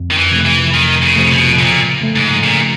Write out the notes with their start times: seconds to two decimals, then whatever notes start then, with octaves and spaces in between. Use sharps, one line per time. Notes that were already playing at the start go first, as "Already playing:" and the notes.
Already playing: F2
0.11 D#3
0.17 E3
0.32 C3 F3 A3
0.46 E3
0.74 F2 D#3
1.02 C#3
1.16 C3 F3 A3
1.31 B2
1.59 A#2 C#3
2.02 F3 A3
2.16 G#2
2.44 A#2 C#3